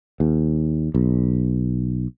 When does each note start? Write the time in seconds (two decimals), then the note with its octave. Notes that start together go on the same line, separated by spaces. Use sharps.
0.20 D#2
0.95 B1